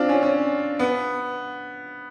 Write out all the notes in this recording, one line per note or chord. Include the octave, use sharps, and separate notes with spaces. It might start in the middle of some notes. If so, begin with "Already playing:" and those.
Already playing: C4 D4 F4
C#4
C#4
B3